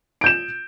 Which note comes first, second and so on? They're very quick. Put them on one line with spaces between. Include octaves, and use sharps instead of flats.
D7 G6 E7